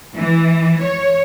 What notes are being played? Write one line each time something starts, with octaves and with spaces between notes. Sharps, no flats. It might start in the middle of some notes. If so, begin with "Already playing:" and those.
E3
C#5